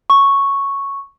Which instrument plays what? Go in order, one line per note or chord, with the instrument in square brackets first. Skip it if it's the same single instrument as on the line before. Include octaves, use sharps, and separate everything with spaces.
[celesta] C#6